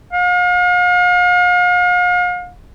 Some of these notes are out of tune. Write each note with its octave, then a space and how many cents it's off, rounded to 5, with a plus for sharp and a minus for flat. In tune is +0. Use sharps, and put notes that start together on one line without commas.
F5 +40